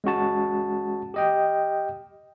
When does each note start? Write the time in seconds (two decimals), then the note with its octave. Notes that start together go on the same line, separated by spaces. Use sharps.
0.04 G#3 C#4 F#4 A5
1.14 G4 D#5 G5